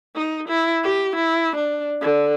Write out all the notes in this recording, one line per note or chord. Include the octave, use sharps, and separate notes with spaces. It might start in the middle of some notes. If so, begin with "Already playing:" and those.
D#4
E4
G4
E4
D4
D3